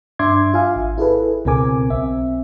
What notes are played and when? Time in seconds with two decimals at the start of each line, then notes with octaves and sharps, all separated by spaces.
0.19 G2 D4 E5 C6 D6 G#6
0.54 F4 E5 F5 G#5
0.76 G#1
0.98 E4 G#4 A4 B4
1.45 C#2 B2 C4 A#4 G#5 D6
1.90 B1 C4 E5